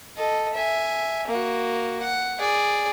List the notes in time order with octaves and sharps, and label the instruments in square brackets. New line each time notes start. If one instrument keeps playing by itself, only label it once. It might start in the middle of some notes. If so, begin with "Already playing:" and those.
[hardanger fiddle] A4 D#5
E5 G#5
A#3 F#4
F#5
G#4 D5